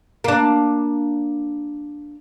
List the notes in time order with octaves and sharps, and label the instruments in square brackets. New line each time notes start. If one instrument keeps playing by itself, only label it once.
[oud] A#3 D4